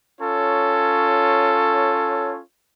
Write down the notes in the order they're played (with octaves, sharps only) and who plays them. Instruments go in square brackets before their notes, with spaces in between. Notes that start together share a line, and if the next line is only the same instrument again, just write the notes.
[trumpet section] C#4 F4 A4 C#5